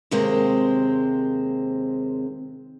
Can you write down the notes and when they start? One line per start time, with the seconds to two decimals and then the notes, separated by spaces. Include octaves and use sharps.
0.11 D#2 C3 G#3 A#3 C4